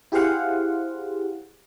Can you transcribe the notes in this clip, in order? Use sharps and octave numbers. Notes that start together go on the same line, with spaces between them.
E4 G4 G#4 C5 F5 F#5